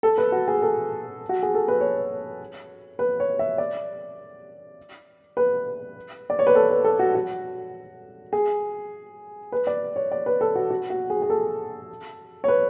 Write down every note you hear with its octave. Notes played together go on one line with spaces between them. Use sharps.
A4
B4
F#4
G#4
A4
F#4
G#4
A4
B4
C#5
B4
C#5
E5
D5
B4
D5
C#5
B4
A4
B4
A4
F#4
F#4
G#4
B4
D5
C#5
D5
B4
A4
F#4
F#4
F#4
G#4
G#4
A4
C#5
B4